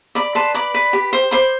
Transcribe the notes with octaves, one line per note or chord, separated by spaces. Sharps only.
D5 B5 D6
B4 A5 C6
D5 B5 D6
B4
G4
C5
C5 B5 D6